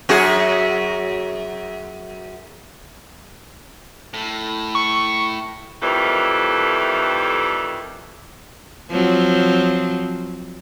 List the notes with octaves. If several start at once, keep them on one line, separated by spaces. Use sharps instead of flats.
F#2 F#4 G#4
A2
C#6
F2 D#3 E3 G3 A3
F3 F#3 C4